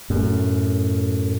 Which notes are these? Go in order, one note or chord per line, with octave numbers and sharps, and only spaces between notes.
F#2 A2